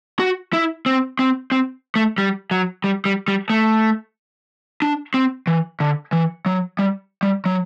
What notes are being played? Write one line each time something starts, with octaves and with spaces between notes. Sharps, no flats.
F#4
E4
C4
C4
C4
A3
G3
F#3
G3
G3
G3
A3
D4
C4
E3
D3
E3
F#3
G3
G3
F#3